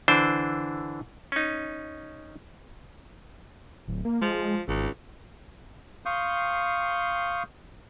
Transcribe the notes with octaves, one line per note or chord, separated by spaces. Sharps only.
D3 E3 D4 C5
C#4 D#4
D1
A#3
F3 G#3
G#1 C#2
F5 C6 C#6 D#6 G6